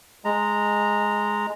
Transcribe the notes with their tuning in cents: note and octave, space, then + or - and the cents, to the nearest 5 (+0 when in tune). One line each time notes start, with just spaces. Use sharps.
G#3 +0 A#5 -10